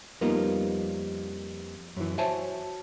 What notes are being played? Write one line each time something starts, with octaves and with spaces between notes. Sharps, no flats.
F2 G3 A#3 B3 D#4 F4
F#2 E3
F#4 C5 C#5 E5 G#5 A5